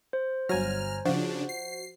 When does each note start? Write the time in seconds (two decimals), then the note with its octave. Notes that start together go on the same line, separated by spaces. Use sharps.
0.13 C5
0.49 G1 F#3 G#5 A#5 F6
1.05 C#3 F3 D4 F#4
1.49 C7